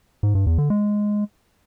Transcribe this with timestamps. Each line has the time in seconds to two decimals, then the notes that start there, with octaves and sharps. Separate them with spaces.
0.23 G#2
0.35 G2
0.47 E2
0.58 D3
0.70 G#3